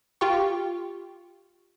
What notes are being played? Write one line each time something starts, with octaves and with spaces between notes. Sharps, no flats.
F4 G4 G5 C#6